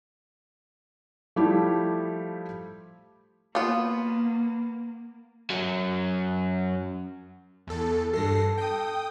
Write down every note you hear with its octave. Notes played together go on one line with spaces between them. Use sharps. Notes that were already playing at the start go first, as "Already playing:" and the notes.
F3 G3 A3 E4 G4
A#3 B3 F4
F#2 F#3
E2 A4
G2 A4 A#6 C7
G5 D#6